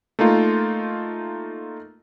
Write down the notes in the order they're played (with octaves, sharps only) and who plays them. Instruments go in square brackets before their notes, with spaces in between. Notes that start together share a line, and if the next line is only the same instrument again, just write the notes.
[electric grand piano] A3 A#3 D#4 F4